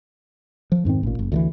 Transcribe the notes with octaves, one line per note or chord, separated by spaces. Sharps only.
F3
F2 G#2 D#3 C4
A1 A#2
F#1
D2 D3 E3